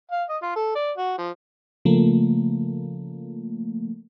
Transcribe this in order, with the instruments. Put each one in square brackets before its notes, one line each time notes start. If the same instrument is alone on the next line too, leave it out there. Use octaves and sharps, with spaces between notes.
[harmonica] F5
D#5
F4
A4
D5
F#4
F3
[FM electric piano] C#3 F3 A3 A#3